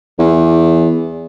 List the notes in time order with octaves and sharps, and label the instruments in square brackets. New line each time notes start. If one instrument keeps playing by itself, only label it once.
[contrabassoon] E2